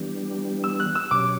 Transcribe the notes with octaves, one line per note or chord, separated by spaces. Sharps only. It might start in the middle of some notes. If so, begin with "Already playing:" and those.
Already playing: E3 G3 B3 D4 G4
E6
F#6
E6
B2 F#3 C#4 G4 C#5 D6